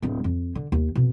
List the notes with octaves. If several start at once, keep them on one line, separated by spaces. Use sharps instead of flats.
D1 D4
F2
D3
D#2
F2 B2